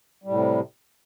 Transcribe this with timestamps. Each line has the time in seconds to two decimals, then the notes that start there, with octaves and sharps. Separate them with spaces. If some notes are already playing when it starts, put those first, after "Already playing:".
0.24 G3
0.27 A2
0.31 C3